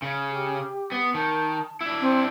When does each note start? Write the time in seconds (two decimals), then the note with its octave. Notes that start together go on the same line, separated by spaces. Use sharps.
0.02 C#3
0.30 G4
0.92 B3
1.14 D#3 A5
1.81 D4 E4
2.01 C4